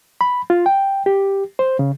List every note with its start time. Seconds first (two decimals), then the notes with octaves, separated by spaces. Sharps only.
0.21 B5
0.50 F4
0.66 G5
1.06 G4
1.59 C5
1.79 C#3